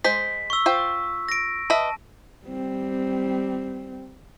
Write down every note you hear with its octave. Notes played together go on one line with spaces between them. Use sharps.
G#3 C5 B6
C#6 E6
F4 C5 G5
A#6 D7
B4 D#5 E5 A5
G3 C4